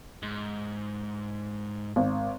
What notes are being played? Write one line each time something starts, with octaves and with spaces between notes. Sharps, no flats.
G#2
G#1